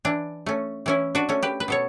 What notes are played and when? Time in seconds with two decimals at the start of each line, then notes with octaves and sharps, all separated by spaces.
0.05 E3 D4
0.46 A3 C#4
0.86 E3 C#4 E4
1.15 D4 F#4
1.29 A3 C#4
1.43 G4 B4
1.60 B4
1.68 B2 A4 C#5